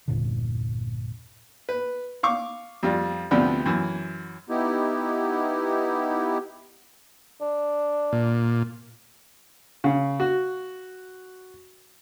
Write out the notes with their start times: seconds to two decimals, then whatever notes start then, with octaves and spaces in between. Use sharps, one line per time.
0.08 G1 E2 A#2 D3
1.69 B4
2.23 F5 C#6 D6
2.83 F2 G3 F4
3.31 D2 C3 F3 B3 D4 B5
3.66 F#2 E3
4.49 B3 D#4 E4 G4
7.41 D4
8.12 A#2
9.84 C#3
10.20 F#4